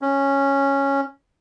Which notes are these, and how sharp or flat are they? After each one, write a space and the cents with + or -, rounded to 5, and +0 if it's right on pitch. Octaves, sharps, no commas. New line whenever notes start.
C#4 -5